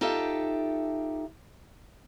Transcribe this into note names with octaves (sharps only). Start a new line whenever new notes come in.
D#4 F4 G4 A4 E5